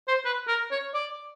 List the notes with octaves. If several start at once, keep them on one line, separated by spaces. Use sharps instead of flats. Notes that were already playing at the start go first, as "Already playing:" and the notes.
C5
B4
A#4
C#5
D5